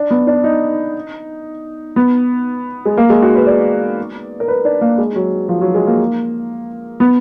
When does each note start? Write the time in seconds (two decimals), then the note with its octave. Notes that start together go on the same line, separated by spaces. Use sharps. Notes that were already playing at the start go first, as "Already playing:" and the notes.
Already playing: D4
0.11 B3
0.27 D4
0.44 D#4
1.96 B3
2.85 G#3
2.97 A#3
3.10 G#3
3.22 F#4
3.35 B4
3.47 D5
4.40 A#4
4.48 B4
4.65 D4
4.81 A#3
4.98 G#3
5.15 F#3
5.49 F3
5.61 F#3
5.74 G#3
5.87 A#3
7.00 B3